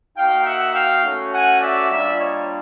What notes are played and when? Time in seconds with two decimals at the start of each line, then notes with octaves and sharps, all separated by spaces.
0.17 A#3 D#4 F#4 F5 G5
0.45 E5 F#5
0.75 F5 G5
1.04 A3 C#4 F#4
1.33 F#5 G#5
1.62 D5 E5
1.90 G3 A#3 D4 F4 D5 E5
2.19 C#5 D#5